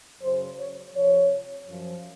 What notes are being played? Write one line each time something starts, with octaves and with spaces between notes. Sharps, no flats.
F#2 C#3 F#3 C5
C#5
F2 C3 F3 C#5
F#2 F3